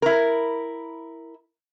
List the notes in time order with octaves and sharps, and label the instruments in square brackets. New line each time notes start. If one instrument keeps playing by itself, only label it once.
[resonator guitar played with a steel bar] E4 A#4